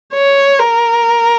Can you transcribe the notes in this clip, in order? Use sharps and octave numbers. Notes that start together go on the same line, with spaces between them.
C#5
A#4